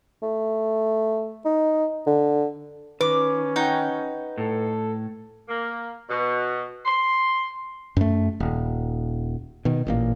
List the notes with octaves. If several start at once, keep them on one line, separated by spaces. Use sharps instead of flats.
A3
D#4
D3
D#3 C#4 B4 D6
D#4 F#5 G5
A2 A4
A#3
B2
C6
F#2 A3
D#1
B2 D#3
A1 A#2 A#3